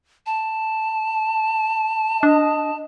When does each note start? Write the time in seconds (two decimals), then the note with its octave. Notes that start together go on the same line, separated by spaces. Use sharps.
0.26 A5
2.23 D4 D#5